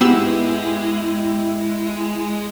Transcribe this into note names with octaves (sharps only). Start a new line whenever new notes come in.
G#2 G#3 B3 E4 G4 E6